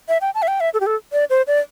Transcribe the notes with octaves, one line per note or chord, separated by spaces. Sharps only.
E5
G5
A5
E5
G5
E5
A4
G4
A4
D5
C5
D5